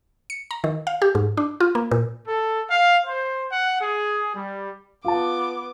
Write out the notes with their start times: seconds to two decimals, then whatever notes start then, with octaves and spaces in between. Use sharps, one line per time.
0.30 C#7
0.51 A#5
0.64 D#3
0.87 F5
1.02 G4
1.15 G#2
1.37 D4
1.60 F4
1.75 A#3
1.91 A#2
2.27 A4
2.70 F5
3.06 C5
3.52 F#5
3.81 G#4
4.35 G3
5.05 B3 F4 A5 D6